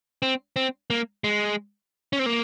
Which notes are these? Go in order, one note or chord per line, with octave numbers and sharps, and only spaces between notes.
C4
C4
A#3
G#3
C#4
C4
A#3